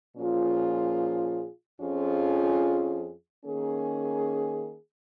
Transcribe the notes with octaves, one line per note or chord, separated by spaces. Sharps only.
A#2 F3 C#4 F4 G#4
F2 F3 C#4 F4 G#4
D#3 A#3 C#4 G#4